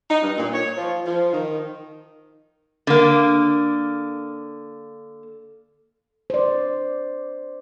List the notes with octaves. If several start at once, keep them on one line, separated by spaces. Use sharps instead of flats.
D#4
G2
A#2
C#5
F3
F3
D#3
D3 A#3
C5 D5